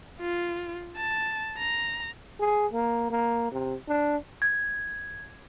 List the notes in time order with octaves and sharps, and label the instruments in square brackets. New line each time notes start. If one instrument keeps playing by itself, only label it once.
[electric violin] F4
A5
A#5
[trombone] G#4
A#3
A#3
C3
D4
[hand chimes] G#6